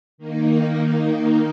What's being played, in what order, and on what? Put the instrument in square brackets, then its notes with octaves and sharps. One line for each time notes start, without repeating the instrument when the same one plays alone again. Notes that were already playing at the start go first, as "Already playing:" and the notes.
[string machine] D#3 A#3 D#4